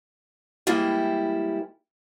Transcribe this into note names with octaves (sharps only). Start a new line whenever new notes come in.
E3 G3 G#3 A#3 E4